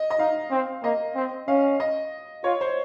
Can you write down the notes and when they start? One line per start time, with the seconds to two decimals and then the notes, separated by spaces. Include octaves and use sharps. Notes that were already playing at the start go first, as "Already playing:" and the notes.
Already playing: D#5
0.10 D#5
0.19 D#4 F5
0.51 C4
0.83 A#3 D#5
1.15 C4
1.48 C#4 F5
1.80 D#5
2.44 F4 C#5
2.61 C5